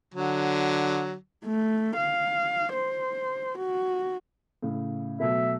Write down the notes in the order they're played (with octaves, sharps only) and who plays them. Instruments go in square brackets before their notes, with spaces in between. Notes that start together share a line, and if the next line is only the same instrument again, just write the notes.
[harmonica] D3 F#3
[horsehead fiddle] A3
F5
C5
F#4
[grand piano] A2 C#3
[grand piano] B2 F#3 A3 [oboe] E5